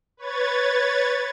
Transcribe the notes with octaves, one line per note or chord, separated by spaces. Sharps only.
B4 C#5 G#6 A6